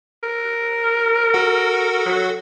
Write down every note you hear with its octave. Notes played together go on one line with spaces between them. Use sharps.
A#4
F#4 A4 F#5
F#3